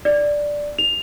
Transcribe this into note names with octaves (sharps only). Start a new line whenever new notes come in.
D5
F7